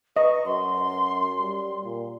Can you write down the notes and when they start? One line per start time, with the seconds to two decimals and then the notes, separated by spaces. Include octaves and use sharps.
0.17 B4 D#5 C#6
0.45 F#2 C6
1.41 G3
1.84 A#2